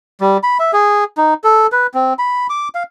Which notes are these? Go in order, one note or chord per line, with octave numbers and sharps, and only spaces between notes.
G3
B5
E5
G#4
D#4
A4
B4
C4
B5
D6
F5